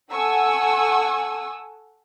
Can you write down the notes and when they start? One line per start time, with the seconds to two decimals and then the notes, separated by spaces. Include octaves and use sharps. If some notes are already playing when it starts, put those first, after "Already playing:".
0.12 A4 F#5 G#5 C#6 D#6 E6